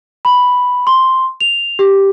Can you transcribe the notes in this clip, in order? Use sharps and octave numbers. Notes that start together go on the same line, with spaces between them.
B5
C6
F7
G4